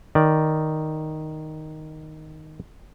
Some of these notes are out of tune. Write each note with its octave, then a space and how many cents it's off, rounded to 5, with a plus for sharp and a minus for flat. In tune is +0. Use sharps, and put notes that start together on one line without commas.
D#3 +0 D5 +0